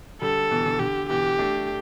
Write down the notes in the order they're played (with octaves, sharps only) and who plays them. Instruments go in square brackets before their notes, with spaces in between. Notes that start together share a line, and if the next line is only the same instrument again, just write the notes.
[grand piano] D3 G3 [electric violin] A4
[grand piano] B2 E3
D3
[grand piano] D3 [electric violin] G4
[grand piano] B2 E3 [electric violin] G4
[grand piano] A3 D4